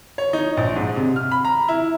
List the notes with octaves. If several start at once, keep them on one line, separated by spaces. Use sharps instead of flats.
C#5
D#4
A#1
G#2
C3
F6
B5
A#5
E4